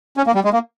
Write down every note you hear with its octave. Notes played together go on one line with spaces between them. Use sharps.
C#4
A#3
G3
G#3
A#3